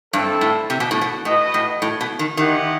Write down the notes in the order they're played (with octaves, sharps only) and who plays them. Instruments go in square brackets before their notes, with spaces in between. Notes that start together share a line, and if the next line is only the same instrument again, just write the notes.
[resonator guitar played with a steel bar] G2 [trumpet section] C4 E4 A4
[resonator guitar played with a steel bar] A2
C3
B2
A2
B2
[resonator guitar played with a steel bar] A2 [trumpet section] F#4 B4 D#5
[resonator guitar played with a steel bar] A2
A2
B2
D#3
[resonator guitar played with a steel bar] D#3 [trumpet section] E4 G4 D#5 F#5